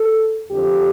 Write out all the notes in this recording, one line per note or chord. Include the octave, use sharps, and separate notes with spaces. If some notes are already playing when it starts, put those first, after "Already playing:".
Already playing: A4
F2 D3 F3 G4